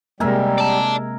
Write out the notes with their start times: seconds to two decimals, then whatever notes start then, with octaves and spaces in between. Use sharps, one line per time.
0.20 C3 G3 G#3 A#3 A#4 E5 G#5
0.58 D5 A5